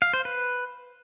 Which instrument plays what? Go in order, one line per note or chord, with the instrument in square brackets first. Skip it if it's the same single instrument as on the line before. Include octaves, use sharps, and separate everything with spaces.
[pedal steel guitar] F5
C5
B4